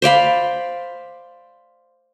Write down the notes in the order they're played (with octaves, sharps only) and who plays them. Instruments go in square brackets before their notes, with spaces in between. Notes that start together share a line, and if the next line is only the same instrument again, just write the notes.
[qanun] C5 D5 F5 B5